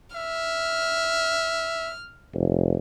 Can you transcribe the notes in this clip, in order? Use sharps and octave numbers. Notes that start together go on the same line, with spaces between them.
E5 F6
F1